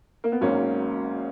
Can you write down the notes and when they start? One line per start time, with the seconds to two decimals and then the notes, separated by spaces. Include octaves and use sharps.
0.24 A#3
0.32 B3
0.41 G#1 G#2 F#3 A#3 C#4